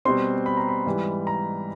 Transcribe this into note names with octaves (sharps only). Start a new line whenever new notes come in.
B2 G3 C4 C6
B5
A#5
B5
G#2 E3 G3
A#5